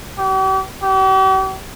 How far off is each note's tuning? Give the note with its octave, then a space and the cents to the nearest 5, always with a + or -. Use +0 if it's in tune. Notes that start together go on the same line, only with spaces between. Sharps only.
G4 -45
G4 -45